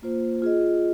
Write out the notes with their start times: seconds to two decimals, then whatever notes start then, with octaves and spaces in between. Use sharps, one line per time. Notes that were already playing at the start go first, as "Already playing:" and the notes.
0.02 A#3 F4 C5
0.42 F4 G#4 D#5